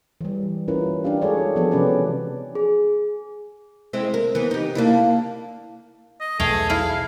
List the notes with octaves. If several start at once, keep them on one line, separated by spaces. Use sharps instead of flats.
E3 G3
G3 C#4 E4 F4 A#4 B4
D4 E4 G4 F5
G#3 F#4 G#4 A4 C#5 D5
F3 B3 F#4 A4
C3 E3 C#4 G4 B4 D5
G#4
G#3 C4 E4
A#4
E3 B3
D#4 G4
A#3 D4 E4
D#5
B1 E2 A3 G#4 A4 F5 G5
E4 G#4 F5